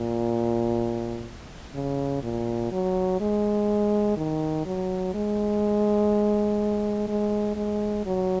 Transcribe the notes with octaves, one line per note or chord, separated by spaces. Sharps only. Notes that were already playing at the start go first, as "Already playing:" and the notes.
Already playing: A#2
C#3
A#2
F#3
G#3
D#3
F#3
G#3
G#3
G#3
F#3